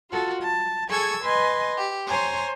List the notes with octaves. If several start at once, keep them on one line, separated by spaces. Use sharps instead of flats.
F4 F#4 A4
A5
G#4 A4 G#5 C#6 E6 G#6
B4 D#5 G#5 C6
G4
C5 C#5 G#5 A#5 C6